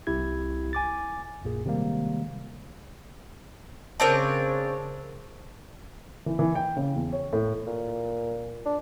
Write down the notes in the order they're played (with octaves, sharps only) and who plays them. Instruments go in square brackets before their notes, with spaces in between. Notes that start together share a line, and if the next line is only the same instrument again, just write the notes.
[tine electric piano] C2 C4 E4 G4 G#6
G#5 D6 A6
A#1 F#2 A#2 G#4
C3 D#3 G3 G#3 A#3
[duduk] C#3 [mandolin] C4 D4 C#5 [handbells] A#4 C5 A5
[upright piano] E3
E3
G5
C#3
E2
C#5
A2
[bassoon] A#2
D4